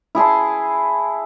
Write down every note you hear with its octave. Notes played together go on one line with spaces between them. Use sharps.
E4 G#4 A5 C6